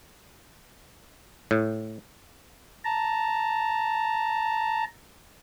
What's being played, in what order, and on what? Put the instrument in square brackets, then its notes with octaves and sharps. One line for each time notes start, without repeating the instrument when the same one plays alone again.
[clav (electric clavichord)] A2
[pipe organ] A5 A#5